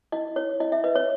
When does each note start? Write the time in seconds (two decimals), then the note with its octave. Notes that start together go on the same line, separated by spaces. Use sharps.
0.12 E4 D#5
0.36 E4 C#5
0.60 E4 D#5
0.72 E5
0.84 B4 D#5
0.95 C#5